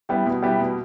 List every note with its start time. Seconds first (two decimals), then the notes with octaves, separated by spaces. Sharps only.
0.09 G3 B3 E4 G4
0.26 B2
0.42 G3 B3 E4 G4
0.60 B2